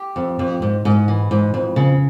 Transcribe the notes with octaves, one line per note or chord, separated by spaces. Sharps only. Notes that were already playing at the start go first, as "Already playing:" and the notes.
Already playing: G4
F2
F2
G#2
G#2
E3
G#2
F2
C#3